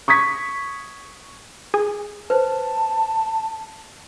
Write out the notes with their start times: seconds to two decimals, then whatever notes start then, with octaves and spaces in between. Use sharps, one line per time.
0.08 C#6 D#6 G#6 B6
1.74 G#4
2.30 B4 C5 A5